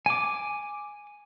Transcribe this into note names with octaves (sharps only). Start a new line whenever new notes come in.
G#5 D6